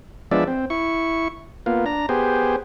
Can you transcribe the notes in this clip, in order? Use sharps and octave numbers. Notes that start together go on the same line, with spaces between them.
F3 G#3 B3 D4 D5 E5
C4
E4 C#6
A#3 B3 F4
D4 A#5
B3 G4 G#4 C5